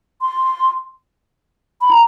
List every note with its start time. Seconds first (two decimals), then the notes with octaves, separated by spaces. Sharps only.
0.22 C6
1.82 B5
1.91 A#5